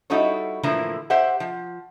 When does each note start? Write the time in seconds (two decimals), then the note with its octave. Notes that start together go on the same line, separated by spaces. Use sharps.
0.10 G3 D#4 E4 F#4 A4 C#5
0.63 A2 D3 E3 F3 A#3 E4
1.10 G4 C5 E5 F#5
1.40 F3